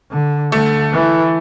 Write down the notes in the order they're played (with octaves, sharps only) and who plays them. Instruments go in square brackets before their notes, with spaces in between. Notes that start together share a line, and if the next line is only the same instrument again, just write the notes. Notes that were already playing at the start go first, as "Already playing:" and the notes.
[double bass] D3
[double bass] D3 [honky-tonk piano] A3
[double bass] E3